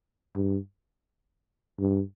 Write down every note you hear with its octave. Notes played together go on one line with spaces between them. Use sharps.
G2
G2